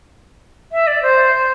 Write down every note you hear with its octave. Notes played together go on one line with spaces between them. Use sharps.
E5
D5
C5